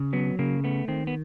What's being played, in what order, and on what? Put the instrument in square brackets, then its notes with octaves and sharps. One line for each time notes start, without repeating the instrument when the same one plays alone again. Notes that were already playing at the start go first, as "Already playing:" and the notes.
Already playing: [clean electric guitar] C#3
F#3 B3
C#3 A#3
A3 B3
D#3 C4
B3